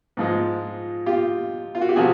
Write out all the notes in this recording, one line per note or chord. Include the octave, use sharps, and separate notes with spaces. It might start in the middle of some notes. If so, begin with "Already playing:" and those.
G#2 F3 G#3
F4 G4
F4
F#4
G4
C3 F3 F#4 G#4